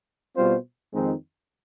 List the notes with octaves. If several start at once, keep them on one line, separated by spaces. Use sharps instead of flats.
B2 G3 C4 F4 C5
F2 D#3 G#3 C4 D#4